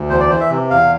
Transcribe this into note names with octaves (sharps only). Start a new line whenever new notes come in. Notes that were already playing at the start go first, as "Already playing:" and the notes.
Already playing: D2
E2 C5
D5
E3 C5
E5
C3
E2 F5